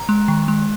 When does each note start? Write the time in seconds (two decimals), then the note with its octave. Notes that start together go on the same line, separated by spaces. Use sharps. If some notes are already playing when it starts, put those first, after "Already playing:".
Already playing: A#5
0.09 G#3
0.28 D#3
0.48 G#3